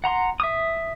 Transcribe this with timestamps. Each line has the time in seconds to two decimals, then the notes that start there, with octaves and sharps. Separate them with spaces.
0.04 F#5 A#5 C6
0.40 E5 D#6